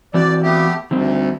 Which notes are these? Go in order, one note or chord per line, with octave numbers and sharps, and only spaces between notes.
E3 C4 F#4 D5
A3 B3 G4
D2 D#3 G3 C4